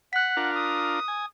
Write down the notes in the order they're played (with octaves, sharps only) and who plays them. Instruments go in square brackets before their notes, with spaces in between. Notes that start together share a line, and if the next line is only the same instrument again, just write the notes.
[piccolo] F#5 [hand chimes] F#6 B6
[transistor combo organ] D4 F4 A#4
[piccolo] D#6
[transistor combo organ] G#5